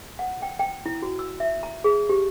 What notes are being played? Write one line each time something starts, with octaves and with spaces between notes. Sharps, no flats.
F#5
G5
G5
E4
F#4
E6
E5
A#5
G#4
G4